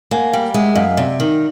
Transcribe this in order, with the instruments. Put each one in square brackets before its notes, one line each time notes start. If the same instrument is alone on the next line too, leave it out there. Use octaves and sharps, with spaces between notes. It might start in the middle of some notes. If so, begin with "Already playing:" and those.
[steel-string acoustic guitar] A#3 [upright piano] F#5 G#5
[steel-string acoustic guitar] G3 [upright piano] F5 G5
[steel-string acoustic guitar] G#3 [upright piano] E5 F#5
[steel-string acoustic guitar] F#2 [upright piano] D#5 F5
[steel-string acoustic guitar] C3 [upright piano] D5 E5
[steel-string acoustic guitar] D#3